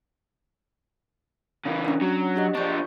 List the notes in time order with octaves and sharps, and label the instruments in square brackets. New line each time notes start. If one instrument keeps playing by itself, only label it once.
[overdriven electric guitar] C#3 E3
[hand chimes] C#4 D4
[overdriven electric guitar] F#3
[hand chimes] D4 G4 D#5
[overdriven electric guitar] F3 D4 [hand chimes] C#6 G6